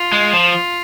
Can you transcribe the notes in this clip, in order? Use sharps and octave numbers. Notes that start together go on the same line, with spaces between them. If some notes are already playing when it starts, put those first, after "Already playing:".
Already playing: F4
G#3
F3